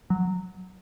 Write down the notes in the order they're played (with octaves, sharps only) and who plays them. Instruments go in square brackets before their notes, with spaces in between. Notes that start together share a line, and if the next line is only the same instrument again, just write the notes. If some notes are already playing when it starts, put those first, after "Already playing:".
[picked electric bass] F#3